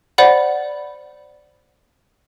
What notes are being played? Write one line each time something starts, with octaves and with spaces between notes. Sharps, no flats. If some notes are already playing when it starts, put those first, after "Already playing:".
C5 D5 F#5 B5